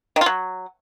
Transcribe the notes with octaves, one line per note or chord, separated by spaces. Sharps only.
D#3
F4
F#3